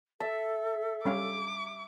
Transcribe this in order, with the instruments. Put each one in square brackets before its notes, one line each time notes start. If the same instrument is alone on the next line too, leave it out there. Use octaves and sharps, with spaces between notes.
[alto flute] A4 [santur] E5 [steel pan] A5
[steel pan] G3 C#4 F5 [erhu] D6